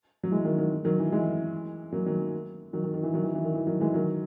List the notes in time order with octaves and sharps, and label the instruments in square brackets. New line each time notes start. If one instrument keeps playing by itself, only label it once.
[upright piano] F#3
E3 G#3
D#3 F#3
D#3 F#3
D#3 F#3
E3
E3 G#3
F#3 A#3
D#3 F#3
D#3 F#3
D#3
D#3
E3
D#3 F#3
E3
E3
D#3
E3
D#3 F#3
E3 G#3
D#3 F#3